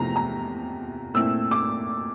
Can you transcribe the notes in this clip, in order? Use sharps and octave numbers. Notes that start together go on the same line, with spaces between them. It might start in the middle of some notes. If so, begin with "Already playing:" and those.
Already playing: E2 C3 F3 A3 A#5
A#5
A#2 A3 C4 E4 E6
D6